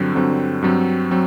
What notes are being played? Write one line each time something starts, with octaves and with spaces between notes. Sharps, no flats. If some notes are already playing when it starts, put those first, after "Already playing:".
Already playing: G2 D3 F#3 C4
G2 D3 F#3 C4
G2 F#3 C4
F#3 C4